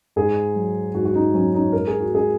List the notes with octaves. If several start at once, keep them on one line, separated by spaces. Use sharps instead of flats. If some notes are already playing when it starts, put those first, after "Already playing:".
G#2 G#4
F#3
G#2 F#4
F#4
D#4
F#3 C#4
D#4
G#2 A#4
G#4
F#4
G#3 G#4